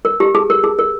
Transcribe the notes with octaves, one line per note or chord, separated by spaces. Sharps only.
A#4
G4
G#4
A#4
G#4
A#4